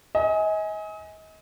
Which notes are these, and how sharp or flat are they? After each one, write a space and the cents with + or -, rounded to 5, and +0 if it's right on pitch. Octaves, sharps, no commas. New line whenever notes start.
D#5 +35 G#5 +0